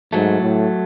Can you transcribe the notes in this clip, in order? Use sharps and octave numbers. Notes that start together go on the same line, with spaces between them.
G#2 F#3 A3
A2